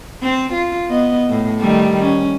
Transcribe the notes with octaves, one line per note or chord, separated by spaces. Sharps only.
C4
F4
B3 D#5
A2
D#3 G3 A3
C#4